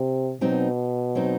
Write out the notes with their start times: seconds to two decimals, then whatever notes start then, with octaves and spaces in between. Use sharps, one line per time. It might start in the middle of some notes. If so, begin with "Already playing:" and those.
Already playing: C3
0.41 B2 F#3 C4 D#4
1.15 F#3 C4 D#4